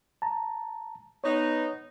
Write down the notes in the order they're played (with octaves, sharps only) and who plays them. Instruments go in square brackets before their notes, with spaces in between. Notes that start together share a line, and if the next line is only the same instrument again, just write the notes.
[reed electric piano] A5 A#5
[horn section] B3 D#4 [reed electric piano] C#5